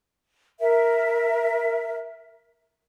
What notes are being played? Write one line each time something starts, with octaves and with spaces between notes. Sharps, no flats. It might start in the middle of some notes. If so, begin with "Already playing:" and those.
A#4 E5